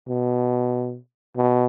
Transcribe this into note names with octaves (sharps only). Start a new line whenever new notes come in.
B2
B2